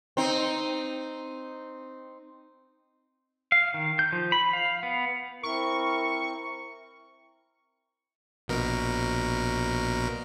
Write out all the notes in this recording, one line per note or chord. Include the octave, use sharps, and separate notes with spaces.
C4 D#4
F5
D#3
G6
F3
B5
F5
B3
C4 E4 A#4 C#6
A#1 B2 A#4